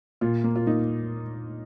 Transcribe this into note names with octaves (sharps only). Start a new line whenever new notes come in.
A#2 F4
A#3
F4
A#3 D#4